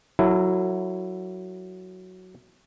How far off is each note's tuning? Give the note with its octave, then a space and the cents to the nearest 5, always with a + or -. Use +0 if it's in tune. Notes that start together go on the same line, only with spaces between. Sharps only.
F#3 +0 E4 +0 A4 +45